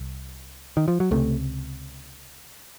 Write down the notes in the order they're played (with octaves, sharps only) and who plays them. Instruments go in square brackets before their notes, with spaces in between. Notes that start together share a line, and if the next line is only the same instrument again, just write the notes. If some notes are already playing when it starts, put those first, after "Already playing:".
Already playing: [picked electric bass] C2
D#3
F3
F#3
C#2 C3 A3